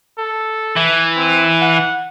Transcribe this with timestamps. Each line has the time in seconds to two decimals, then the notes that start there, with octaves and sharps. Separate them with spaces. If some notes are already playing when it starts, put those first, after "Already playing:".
0.18 A4
0.77 E3
1.16 C4
1.62 F#5